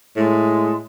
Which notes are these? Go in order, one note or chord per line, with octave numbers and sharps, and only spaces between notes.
A2 G#3